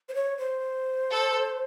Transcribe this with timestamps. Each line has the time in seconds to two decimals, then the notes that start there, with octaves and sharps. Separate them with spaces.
0.09 C5
0.14 C#5
0.38 C5
1.11 A4